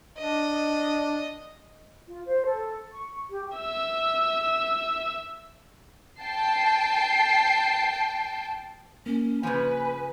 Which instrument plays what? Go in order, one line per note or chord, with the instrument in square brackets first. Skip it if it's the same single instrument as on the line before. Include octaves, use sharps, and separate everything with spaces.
[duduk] D4 [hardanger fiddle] D#5
[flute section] F4
C5
A4
C#6
G4
[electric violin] E5 E6
[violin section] G5 A5 C7
[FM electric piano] A#3 [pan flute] C#4
[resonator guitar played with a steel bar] C#3 F3 [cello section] B4 [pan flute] G#5